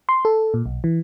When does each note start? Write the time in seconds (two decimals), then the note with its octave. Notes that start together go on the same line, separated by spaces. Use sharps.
0.09 C6
0.25 A4
0.54 A#2
0.66 B1
0.84 E3